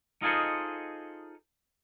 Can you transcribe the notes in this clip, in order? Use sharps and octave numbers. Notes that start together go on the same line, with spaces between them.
D#4 F4 G#4 A4 C5 D#5